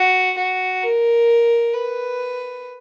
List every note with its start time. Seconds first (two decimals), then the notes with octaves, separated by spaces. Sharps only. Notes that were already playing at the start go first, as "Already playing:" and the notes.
Already playing: F#4
0.38 F#4
0.83 A#4
1.74 B4